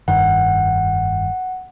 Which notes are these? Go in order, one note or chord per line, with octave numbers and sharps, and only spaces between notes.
F1 G2 D#3 F#5